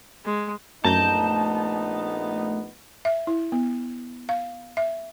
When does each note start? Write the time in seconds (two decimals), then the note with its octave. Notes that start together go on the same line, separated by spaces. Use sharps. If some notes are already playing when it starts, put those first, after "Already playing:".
0.25 G#3
0.85 A#1 F#2 A3 B3 D#4 A5 A#5 G6
3.05 E5
3.27 E4
3.52 B3
4.29 F5
4.77 E5